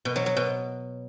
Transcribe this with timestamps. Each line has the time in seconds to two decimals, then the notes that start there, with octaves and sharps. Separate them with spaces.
0.05 B2
0.16 F#3
0.26 F#3
0.37 B2